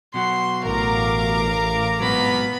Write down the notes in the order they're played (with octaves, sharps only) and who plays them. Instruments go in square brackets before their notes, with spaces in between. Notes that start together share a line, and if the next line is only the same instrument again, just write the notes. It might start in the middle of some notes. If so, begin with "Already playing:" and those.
[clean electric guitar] B2 F#3 F#4 [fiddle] C6
[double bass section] A1 [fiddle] A#4 [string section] F5 A#5 D6
[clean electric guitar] G#2 B2 F#3 [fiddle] B3 B5